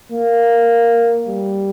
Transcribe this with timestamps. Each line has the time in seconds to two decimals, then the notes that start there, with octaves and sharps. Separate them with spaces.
0.12 A#3
1.28 G3